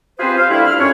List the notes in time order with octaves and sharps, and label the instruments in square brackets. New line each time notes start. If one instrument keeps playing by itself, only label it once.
[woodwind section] C4 F4 G4 G#4 B4 C5
C5 F5
G3 A3 D4 E4
F6
C2 F2 C#4 D4 C#5